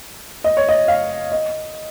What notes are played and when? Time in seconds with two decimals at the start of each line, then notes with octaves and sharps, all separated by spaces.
0.44 D#5
0.57 C#5
0.69 D#5
0.88 F5
1.32 D#5